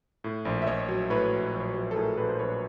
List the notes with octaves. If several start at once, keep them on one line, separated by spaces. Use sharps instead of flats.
A2
A#1
E5
A#1 C#5 D#5
F#3
A2 B4 C#5
A#1
A#1
F#3
A4
A2 G#4 A#4
A#1 A4 B4
C5
A#1 B4 C#5